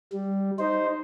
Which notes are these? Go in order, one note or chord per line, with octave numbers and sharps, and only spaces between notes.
G3
D#4 C5